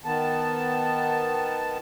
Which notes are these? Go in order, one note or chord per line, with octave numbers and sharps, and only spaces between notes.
D#3 B3 A5